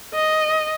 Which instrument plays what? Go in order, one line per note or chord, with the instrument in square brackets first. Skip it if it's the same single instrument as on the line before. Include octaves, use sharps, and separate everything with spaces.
[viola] D#5